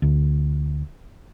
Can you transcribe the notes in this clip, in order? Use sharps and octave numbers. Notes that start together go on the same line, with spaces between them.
D2